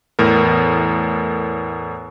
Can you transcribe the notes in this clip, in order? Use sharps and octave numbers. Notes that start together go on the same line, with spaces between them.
E2 A2 A#4